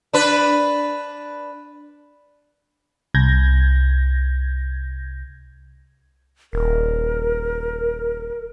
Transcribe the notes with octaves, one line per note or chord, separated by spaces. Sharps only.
D4 B4
C2 G6 G#6 A#6
D#1 A#4